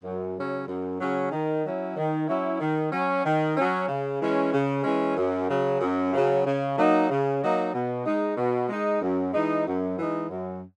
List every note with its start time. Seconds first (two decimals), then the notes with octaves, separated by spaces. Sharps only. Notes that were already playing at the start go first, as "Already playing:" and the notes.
0.04 F#2
0.36 C#3 F#3 C#4
0.67 F#2
1.01 C#3 F#3 C#4
1.32 D#3
1.64 F#3 C#4 E4
1.97 D#3
2.28 F#3 C#4 E4
2.60 D#3
2.92 F#3 C#4
3.25 D#3
3.56 F#3 C#4
3.88 C#3
4.20 E3 G#3 C#4
4.53 C#3
4.84 E3 G#3 C#4
5.17 F#2
5.49 C#3 F#3
5.81 F#2
6.13 C#3 F#3
6.45 C#3
6.77 F#3 A#3 D#4
7.10 C#3
7.41 F#3 A#3 D#4
7.73 B2
8.06 G#3 D#4
8.37 B2
8.69 G#3 D#4
9.01 F#2
9.33 E3 G#3 D#4
9.66 F#2
9.97 E3 G#3 D#4
10.29 F#2